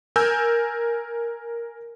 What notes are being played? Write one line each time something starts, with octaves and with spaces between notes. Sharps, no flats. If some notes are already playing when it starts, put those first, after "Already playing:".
A#4 G#5 E6 G6